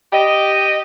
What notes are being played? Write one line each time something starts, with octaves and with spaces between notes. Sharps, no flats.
G4 D#5